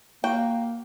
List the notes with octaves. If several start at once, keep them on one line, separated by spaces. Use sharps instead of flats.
A#3 F#4 G5